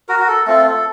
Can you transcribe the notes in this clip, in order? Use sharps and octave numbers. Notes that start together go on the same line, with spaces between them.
F#4 A#4
F#4
A4
A3 C4 F4 A4
A4